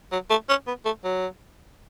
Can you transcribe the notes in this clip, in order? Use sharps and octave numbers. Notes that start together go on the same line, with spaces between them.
F#3
A3
C#4
B3
A3
F#3